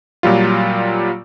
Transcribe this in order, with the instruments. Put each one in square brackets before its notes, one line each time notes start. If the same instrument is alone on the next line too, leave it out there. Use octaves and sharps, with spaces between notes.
[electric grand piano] A#2 F#3 G3 F4